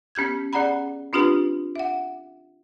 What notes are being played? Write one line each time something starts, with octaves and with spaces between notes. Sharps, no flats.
B3 C#4 G4 G6 G#6
C#4 G#4 D5 F#5 A#5 B5
C4 D4 F4 G4 B4
E5 F#5